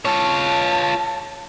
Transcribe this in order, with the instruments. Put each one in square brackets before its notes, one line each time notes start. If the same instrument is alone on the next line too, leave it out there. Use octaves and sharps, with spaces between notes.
[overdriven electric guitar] F4 C#5 [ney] A5